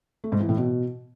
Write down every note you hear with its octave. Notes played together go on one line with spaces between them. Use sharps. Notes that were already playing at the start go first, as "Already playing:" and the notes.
A3
G#2
E3
A2
B2